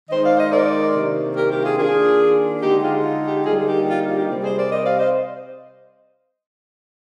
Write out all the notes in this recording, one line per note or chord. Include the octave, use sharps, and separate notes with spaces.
D#3 G#3 D#4 C5 D#5
D5 F5
C5 D#5
A#4 D5
C3 D#3 A#3 D4
G4 A#4
G4
F4 G#4
D#3 A#3 D4 F4 G#4
D3 G#3 D#4 G4
F4 G#4
F4
G4
D3 G3 A#3 D#4 F4 G#4
G#4
G4
F4
G4
F4
G4
C3 G3 C4
G#4 C5
A#4 D5
C5 D#5
D5 F5
C5 D#5